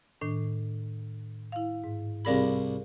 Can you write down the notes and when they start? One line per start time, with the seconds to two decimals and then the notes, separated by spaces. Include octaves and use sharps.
0.21 A2 D#3 D4
1.52 E4 F5
1.84 G#2
2.25 C2 D4 G#4 A#4 F5 B5